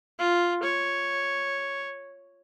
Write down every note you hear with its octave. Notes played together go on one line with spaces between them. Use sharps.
F4
C#5